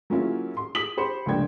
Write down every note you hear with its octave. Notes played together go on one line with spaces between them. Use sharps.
F#3 A#3 C#4 E4 F4 G#4
C6
D#6 B6 F#7
G4 C5 B5 C#7
F1 C#2 A#3 D4 G5 G#6